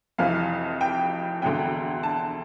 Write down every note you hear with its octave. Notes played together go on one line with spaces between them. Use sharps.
F1 F2 E3 F5
G5
E1 D2 D3 G5
A5